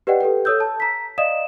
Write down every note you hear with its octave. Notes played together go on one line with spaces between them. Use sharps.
G4 B4 D5 D#5 F#5 G5
G4 A4 B4 G5
A4 C#5 D#6 E6 G6
A5
A#5 B6
D5 D#5 F5 D#6 E7